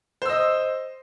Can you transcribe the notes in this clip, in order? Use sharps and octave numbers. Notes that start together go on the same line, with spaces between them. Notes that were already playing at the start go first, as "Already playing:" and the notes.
C5 D#5 E6